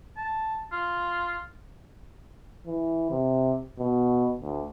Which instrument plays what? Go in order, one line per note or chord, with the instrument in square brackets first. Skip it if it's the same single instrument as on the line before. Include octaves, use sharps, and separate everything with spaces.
[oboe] A5
F4
[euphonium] E3
C3
B2
D2